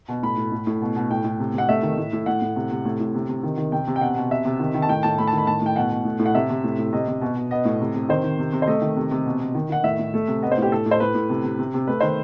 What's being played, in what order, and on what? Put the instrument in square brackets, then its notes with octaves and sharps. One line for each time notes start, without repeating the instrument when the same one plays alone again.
[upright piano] B2
A2 B5
A2
A2
A2
B2
B2
A2 G5
A2
C3
C3 F#5
A3 E5
D#3
A2
A2
A2 F#5
A2
C3
C3
A2
A2
C3
C3
D#3
D#3
C3 G5
C3
G5
B2 F#5
B2
C3 E5
C3
D#3
D#3
A5
A2 G5
A2 A5
A3 B5
A5
D#3 B5
A2 A5
A2 G5
B2 F#5
B2
A2
A2
F#5
C3 E5
C3
A2
A2
C3 D#5
C3
B2
B2
B3 D#5
A2
C3
C3
D#3 C5
D#3
C3
C3
C5
A3 D#5
D#3
C3
C3
B2
B2
D#3
D#3 F#5
A2 E5
A2
A3
C3
B3 D#5
C5
A2 G4
A2 A4
A2
C5
A2 B4
A2
C3
C3
C3
C3
A3 B4
D#3 C5